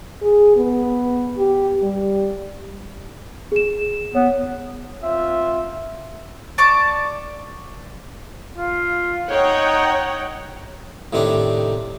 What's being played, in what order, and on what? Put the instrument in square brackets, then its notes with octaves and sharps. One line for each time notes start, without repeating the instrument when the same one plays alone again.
[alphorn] G#4
B3
G4
G3
[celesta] G#4 E7
[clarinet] B3 [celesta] C#5
[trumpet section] C4 F4 E5
[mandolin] D5 A5 C#6 D6
[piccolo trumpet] F4
[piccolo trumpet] D#4 [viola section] C#5 F#5 G5
[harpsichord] A2 C3 D#3 C4 D4